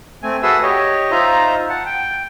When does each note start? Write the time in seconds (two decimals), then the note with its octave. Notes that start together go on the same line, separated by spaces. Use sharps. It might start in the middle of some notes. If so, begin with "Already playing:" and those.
0.23 A3 C4 G#5
0.43 F#4 G#4 A4 B4 E5 E6
0.63 G4 C#5 D#5
1.11 D#4 F4 C5 E5 A#5
1.69 F#5 A5
1.86 G5